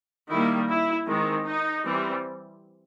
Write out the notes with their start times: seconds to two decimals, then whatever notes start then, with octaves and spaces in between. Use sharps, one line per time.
0.30 D#3 G3 A#3 E4
0.69 E4
1.07 D#3 G#3 C4
1.45 D#4
1.84 E3 G3 C4